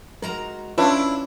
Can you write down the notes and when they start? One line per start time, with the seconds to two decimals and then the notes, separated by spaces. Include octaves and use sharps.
0.22 G#3 F#4 A#4 A#5
0.78 C#4 D4 E4 F4 B4 C#5